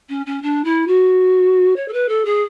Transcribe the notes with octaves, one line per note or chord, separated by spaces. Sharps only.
C#4
C#4
D4
E4
F#4
C#5
A4
B4
A4
G#4